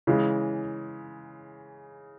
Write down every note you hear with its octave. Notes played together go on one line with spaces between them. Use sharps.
C#3 E3 G#3